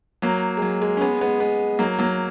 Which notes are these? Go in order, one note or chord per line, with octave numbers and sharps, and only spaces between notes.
F#3 A#3
G#3
F#3
G#3
C#4
G#3 B3
G#3 B3
G#3 B3
F#3 A#3
F#3 A#3